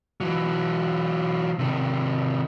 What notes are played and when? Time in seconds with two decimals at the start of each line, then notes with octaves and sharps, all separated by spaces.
0.20 E3 F#3
1.59 C3 D#3